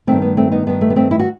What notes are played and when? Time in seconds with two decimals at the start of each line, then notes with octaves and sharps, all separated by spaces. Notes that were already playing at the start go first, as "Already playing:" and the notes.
0.07 G2 D#3 A3 C4
0.22 B3
0.37 A3 C4
0.51 B3 D#4
0.67 G2 D#3 B3
0.81 A3
0.90 B3
0.96 A3 C4
1.11 E4
1.19 F#4